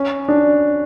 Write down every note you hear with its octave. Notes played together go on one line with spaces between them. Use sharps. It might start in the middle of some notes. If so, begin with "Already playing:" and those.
Already playing: C#4
D4